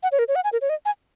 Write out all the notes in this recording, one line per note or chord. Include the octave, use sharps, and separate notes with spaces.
F#5
C#5
A#4
C#5
F#5
G#5
A#4
C#5
D#5
G#5